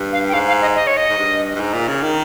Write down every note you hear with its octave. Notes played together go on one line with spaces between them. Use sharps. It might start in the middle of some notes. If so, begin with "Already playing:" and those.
Already playing: G2
F5
G5
G#2 F5
F5
D#5
D#5
C#5
D#5
G#2
G2
G2
G#2
A#2
C#3
D#3